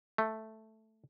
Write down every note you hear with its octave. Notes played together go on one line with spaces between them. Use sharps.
A3